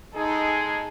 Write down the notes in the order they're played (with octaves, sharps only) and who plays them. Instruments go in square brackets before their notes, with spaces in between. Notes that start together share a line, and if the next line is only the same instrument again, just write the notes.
[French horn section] G#3 G#4 [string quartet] D#4 A4